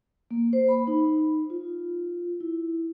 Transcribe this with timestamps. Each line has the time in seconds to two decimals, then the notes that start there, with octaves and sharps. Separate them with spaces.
0.31 A#3
0.53 C5
0.68 B5
0.87 D#4
1.50 F4
2.41 E4